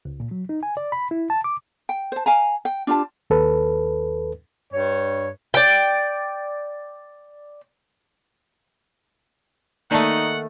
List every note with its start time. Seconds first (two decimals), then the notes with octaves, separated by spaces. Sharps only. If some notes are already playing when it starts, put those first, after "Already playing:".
0.05 C#2
0.20 A#2
0.31 F#3
0.49 D#4
0.63 G#5
0.77 D5
0.92 B5
1.11 E4
1.30 A5
1.44 D6
1.89 G5
2.12 C5 A5
2.26 F5 G#5 A#5
2.65 G5
2.87 D4 F4 G4 A5
3.30 D#2 A4 B4
4.73 G2 C#5
5.54 D5 G5
9.91 D#3 A3 A#3 D#4 D5 F#5 A5